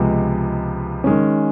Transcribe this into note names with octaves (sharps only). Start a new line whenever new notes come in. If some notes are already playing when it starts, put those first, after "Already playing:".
Already playing: C#2 C3 F3 G#3 B3
D#3 G#3 C#4